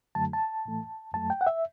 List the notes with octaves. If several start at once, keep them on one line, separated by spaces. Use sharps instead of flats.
F#2 D3 F#3 A3 A5
A5
A2 E3 A3
F#2 F#3 A3 A5
G5
F#5
E5